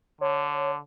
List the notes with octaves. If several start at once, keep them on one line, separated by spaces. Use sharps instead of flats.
D3 C#5